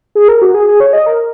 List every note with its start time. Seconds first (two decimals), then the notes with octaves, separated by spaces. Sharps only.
0.15 G#4
0.28 A#4
0.42 F#4
0.54 G#4
0.68 G#4
0.80 C#5
0.93 D#5
1.06 A#4